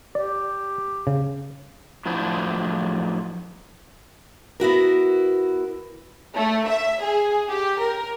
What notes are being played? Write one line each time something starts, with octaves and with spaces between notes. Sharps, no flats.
G4 D5
C#3
A2 F3 F#3 D4 E4 C5
B3 E4 F#4 A#4
A3
E5
G#4
G4
A#4